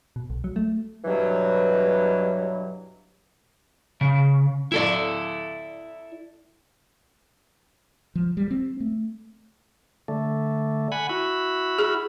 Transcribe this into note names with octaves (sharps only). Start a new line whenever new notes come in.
B2
B1
F#3
A3
G2 B2 E3 F#3
C#3
E4 A4 D5
F3
G3
C4
A3
D3 A3
F#5 G#5 B5
E4 F#4 B5
G#4